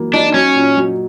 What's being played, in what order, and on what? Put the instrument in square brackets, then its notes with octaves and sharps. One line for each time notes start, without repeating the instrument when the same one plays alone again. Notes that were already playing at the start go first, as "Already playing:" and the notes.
Already playing: [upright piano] E3 F#3 A#3
[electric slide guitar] D4 [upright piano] D#4
[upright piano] F#3 [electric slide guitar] C#4
[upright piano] A#2
F#3